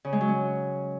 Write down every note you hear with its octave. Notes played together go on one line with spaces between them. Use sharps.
C#3
G#3
F#3
C#4